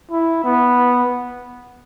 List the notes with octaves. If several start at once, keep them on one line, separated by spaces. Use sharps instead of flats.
E4
B3